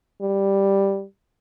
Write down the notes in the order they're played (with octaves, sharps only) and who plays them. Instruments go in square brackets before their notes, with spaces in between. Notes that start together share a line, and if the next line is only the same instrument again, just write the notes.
[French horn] G3